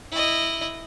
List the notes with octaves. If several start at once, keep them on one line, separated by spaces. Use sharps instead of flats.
E4 D#5